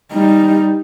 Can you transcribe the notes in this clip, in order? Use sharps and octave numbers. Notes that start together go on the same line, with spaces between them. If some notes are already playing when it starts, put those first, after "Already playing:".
G3 D#4